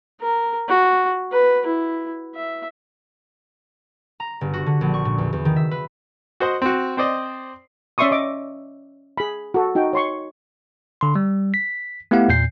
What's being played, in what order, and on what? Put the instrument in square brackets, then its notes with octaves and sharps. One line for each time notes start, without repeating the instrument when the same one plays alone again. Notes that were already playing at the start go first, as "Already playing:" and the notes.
[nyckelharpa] A#4
F#4
B4
E4
E5
[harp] A#5
G1
F#4
D3
A#1
C#6
A#2
E2
E2
D#3
E5
B4
[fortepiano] F#4 C5 D#5 F#5
C4 F#4
C4 C5 D5 D#5
[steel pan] C#4 D5 E5 C6 C#6 D#6
D#5 D6
G#4 B5
F#4 A4
D#4 F#4 G5
C#5 C6 C#6
[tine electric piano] D3 C6
G3
B6
A3 B3 E4 G4 F5 F#5
E2 A#2 G6 C7